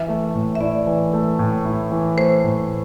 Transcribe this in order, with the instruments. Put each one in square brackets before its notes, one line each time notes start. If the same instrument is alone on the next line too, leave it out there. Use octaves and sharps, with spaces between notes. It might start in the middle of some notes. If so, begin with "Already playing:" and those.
Already playing: [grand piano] E3 [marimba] E5
[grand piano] A3
A2
[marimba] E5
[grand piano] E4 [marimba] D5
[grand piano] E3
A3
A2
E4
E3
[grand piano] A3 [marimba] C5
[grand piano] A2